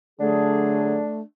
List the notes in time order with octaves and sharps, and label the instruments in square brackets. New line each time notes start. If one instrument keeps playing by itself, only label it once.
[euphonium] D3 [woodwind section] F#3 G#4 [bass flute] A3 [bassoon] D4